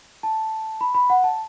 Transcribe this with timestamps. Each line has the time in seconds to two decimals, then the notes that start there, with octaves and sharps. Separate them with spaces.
0.23 A5
0.81 B5
0.94 B5
1.10 F#5
1.24 A5